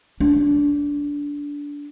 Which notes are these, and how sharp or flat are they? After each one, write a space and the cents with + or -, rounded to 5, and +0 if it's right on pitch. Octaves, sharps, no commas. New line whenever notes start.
D4 -20